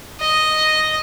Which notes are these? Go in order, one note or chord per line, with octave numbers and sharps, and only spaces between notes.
D#5